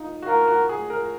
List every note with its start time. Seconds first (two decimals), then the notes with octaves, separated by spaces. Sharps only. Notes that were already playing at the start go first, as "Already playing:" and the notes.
Already playing: D#4 F4
0.22 F#4
0.27 F4 A#4
0.48 F#4
0.69 G#4
0.90 A#4